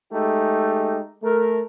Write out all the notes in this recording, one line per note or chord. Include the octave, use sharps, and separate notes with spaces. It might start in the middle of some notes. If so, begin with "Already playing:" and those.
G#3 A3 D#4 G4
A3 A#4